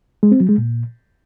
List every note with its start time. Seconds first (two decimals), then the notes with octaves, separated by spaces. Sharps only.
0.23 G#3
0.32 C4
0.40 F#3
0.49 G#3
0.58 A#2